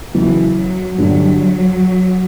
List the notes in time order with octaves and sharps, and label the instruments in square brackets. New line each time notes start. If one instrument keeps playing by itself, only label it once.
[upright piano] E2 C#3 F#3 B3 E4 [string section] E3
[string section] F#3
[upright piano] G2 D3 G3 D4 [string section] F#3